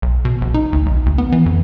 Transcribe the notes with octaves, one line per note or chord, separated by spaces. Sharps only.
B1
B2
A#1
D#4
D2
B1
D2
B3
E3
F2